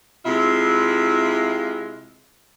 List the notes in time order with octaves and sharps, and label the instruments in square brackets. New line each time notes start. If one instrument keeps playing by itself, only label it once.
[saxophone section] C3 G#3 E4 F4 E5